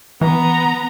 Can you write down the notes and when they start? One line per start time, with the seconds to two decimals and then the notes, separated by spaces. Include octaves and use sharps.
0.21 E3 B3 A#5